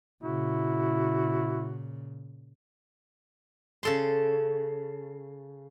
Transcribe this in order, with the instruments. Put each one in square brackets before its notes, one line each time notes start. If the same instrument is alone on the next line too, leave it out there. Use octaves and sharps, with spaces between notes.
[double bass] A#2 C#3 [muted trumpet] E4 [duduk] F#4
[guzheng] C#3 A4 C6